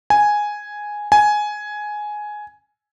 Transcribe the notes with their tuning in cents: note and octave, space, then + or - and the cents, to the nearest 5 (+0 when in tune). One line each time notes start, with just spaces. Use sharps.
G#5 +0
G#5 +10